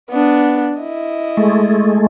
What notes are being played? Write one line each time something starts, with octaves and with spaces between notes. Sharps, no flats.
B3 D4
E4 D#5
G#3 A3